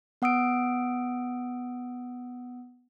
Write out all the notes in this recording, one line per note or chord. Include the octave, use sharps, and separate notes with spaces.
B3 F#5 D#6 E6 D7